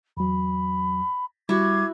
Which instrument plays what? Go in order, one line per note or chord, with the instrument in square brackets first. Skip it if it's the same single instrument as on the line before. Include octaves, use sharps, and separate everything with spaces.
[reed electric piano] E2 F#3 [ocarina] B5
[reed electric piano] G3 [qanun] E4 F#4 [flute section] D6 G#6